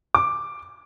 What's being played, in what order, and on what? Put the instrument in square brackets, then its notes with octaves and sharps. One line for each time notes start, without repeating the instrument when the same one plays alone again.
[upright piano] D6